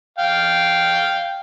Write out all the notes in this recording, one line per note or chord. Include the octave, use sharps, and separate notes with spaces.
F5 G5